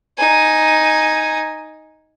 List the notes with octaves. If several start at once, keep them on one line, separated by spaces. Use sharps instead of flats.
D#4 G#5